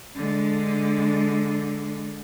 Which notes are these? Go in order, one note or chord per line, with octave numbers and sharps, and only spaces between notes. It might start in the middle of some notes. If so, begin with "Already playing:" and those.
D3 G#3